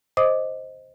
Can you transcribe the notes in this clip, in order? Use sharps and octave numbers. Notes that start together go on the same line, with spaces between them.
C5 D#5 D6 D#6